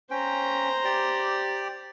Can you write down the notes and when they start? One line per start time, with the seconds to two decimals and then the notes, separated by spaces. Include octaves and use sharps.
0.11 C#4 C5 G5 A#5
0.85 G4 D5